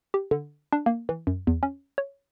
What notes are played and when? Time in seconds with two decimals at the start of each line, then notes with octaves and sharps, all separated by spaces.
0.14 G4
0.31 D3
0.73 D4
0.86 A#3
1.09 E3
1.27 F#2
1.47 E2
1.63 C#4
1.98 C#5